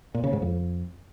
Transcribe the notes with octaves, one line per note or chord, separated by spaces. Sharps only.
A#2
C#3
G#2
F2